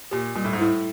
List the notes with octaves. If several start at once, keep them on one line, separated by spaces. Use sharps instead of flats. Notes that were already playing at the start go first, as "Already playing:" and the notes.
A#2 G4
A#2 G3
A2
G#2
A2 E4